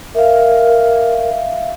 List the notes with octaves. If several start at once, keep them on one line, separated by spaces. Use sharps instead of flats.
A#4 E5 F5